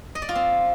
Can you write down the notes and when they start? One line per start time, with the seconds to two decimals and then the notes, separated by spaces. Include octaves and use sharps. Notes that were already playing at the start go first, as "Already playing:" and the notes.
0.15 D#5
0.22 D5
0.29 F4
0.35 C4